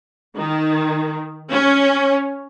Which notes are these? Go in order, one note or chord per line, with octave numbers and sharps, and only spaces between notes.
D#3
C#4